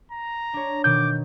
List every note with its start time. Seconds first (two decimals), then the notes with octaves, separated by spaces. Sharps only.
0.12 A#5
0.54 D4 C#5
0.84 B2 D#3 D6 G6